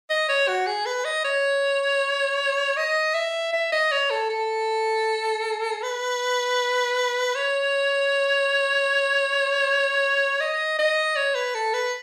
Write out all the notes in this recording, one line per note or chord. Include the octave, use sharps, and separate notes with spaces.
D#5
C#5
F#4
G#4
B4
D#5
C#5
D#5
E5
E5
D#5
C#5
A4
A4
B4
C#5
D#5
D#5
C#5
B4
A4
B4